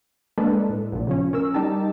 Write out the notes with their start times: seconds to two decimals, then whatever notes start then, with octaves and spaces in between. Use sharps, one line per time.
0.38 G#3 A#3 D4 A4 B4
0.69 A2
0.92 A#1 A#2
1.07 C#3 F3 C#4
1.33 C#4 A#4 E6
1.54 G3 D#4 G4 A5